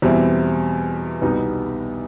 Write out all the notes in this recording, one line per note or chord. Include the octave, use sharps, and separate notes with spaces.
E2 B2 G3 C4 E4
C2 B2 G3 B3 D#4